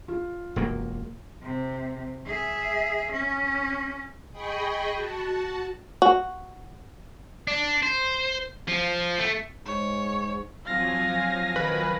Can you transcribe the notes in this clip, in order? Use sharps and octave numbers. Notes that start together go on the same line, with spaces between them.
F4
E1 F#2 A#3
C3
G#4 E5
C#4
G#4 D#5 G5 B5 C#6
F#4 A5
F#4
D4
C5
F3
A3
G#2 C#5
F3 F#3 C4 F4 F5 G#5 A#6
D#3 B4